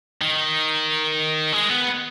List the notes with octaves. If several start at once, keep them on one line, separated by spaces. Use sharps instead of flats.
D#3
G#3
B3